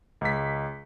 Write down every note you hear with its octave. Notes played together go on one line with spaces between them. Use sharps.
C#2 B6